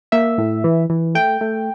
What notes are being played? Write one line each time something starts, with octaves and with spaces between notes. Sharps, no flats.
A#3 E5
A2
E3
E3
A3 G5
A3